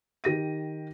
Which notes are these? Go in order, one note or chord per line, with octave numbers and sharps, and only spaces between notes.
D#3 G4 A#6 D#7